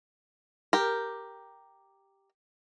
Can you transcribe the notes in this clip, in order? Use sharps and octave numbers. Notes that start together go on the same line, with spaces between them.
G4 A#4